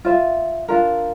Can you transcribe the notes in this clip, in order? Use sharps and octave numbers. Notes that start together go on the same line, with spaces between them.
F4 C5 E5
D4 F4 A#4